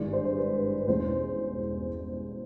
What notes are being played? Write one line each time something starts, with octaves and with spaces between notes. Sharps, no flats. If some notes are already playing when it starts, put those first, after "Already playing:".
Already playing: G#1 G2 E3 G#3 D5
C5
C5
B4
E2 B2 G#3 C#4 C5